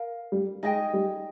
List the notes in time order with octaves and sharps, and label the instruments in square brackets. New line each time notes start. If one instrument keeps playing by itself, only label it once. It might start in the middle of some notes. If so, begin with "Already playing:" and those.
Already playing: [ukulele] A#4 F5
[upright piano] G3
[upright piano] G#3 [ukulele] D#4 G#4 D#5 G5
[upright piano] G3